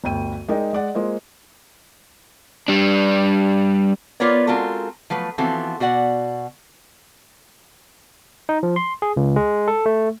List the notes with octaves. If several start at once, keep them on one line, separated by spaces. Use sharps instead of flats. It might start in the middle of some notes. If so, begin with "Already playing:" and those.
G1 D2 G5 D#7
G#3 D#4 A#4 D5 G5
G#3 D5 F#5
G#3 A#3 F4 C5 D#5
G3 D4
B3 F4 A#4 B4 C#5 D5
G#3 C4 F4 F#4 A4 A#4
F3 F#3 A3 B4
E3 F3 B3 C4 F#4 A4
B2 F#4 D5 F#5
D#4
F3
C6
G#4
C#2
G#3
A4
A3